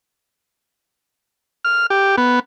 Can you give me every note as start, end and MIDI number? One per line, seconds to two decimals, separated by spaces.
1.65 1.86 89
1.90 2.16 67
2.18 2.39 59